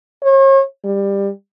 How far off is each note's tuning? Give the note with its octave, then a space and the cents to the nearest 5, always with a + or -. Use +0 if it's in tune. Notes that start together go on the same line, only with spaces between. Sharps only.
C#5 -40
G3 +20